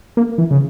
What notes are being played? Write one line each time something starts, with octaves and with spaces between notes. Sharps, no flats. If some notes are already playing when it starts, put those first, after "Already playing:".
A#3
E3
C#3